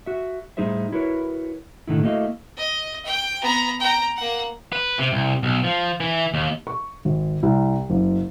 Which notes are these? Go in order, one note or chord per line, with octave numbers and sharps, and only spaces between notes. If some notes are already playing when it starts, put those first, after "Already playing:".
F#4 E5
A2 G3 D#4 G#4 C5 E5
E4 F#4 A#4 B4 C#5
A2 D3 D#3 A3 E4
A3 A#3 E4 F#4 D#5 F5
D#5
G5
B3 A#5
G5 A#5
A#3 F#5
B4
C3
C2
B1
F3
E3
D#2
C#6
G#1
C2
F#1